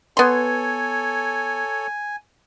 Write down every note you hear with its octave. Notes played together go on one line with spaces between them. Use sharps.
B3 A4 C#5 G#5 C6